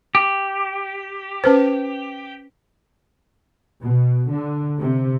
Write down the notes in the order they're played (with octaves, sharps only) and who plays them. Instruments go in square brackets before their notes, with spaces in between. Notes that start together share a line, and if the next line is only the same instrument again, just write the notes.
[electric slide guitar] G4
[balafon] C#4 B4 C5
[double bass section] B2
D3
C3